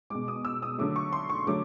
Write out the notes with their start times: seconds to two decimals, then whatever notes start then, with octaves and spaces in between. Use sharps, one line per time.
0.10 B2 G#3 D6
0.28 D#6
0.45 E6
0.62 D#6
0.79 D3 F#3 A3 D6
0.96 C#6
1.13 C6
1.30 C#6
1.47 D3 F#3 A3 D6